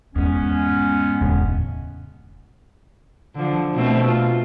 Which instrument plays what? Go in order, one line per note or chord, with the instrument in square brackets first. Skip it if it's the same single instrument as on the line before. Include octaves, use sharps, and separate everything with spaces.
[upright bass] E2 G#2 [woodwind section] G#3 B3 C#4
[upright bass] E1 [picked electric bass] D2 A2 C#3
[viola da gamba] D3 F3
B2 A3 C4
F4